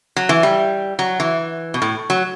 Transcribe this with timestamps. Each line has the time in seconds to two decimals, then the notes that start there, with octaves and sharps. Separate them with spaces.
0.16 F#3
0.29 E3
0.43 G3
0.99 F#3
1.20 E3
1.74 B2
1.82 A2
2.10 F#3